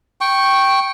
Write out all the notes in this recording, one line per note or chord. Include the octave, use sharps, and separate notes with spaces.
G5 C#6